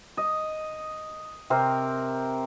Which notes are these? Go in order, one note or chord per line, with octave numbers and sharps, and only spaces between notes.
D#5
C3 C4 A#4